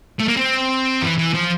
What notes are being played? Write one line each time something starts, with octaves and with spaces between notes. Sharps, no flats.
A3
A#3
C4
E3
E3
F3